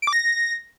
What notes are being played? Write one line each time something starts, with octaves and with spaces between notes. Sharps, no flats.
D7
D6
A#6